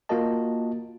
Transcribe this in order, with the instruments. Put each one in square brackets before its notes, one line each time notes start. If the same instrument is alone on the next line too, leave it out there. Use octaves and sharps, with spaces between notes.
[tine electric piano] A#3 F4 F#4 A#4 D#5 A5